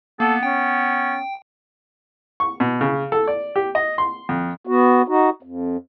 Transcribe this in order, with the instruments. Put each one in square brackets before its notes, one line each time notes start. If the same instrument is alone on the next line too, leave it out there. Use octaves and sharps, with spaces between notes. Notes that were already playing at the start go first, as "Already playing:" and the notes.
[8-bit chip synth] A#3 [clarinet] B3 [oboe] A4
[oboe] C#4 [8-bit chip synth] G5
[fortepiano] C#6
B2
C#3
A4
D5
G4
D#5
C6
F2
[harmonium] B3 F#4
D#4 F#4
F2